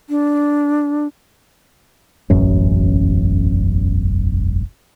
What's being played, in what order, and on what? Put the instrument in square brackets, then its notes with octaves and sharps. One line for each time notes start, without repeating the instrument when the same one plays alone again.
[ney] D4
[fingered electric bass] E1 A1 F#2 C#4